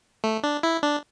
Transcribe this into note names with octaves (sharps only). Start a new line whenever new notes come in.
A3
D4
E4
D4